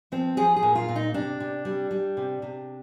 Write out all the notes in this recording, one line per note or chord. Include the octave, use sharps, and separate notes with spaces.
F3 C4
F3 G#4
G#4
A#2
F4
A#2
D#4
C3 D4
C3
G3
G3
C3
C3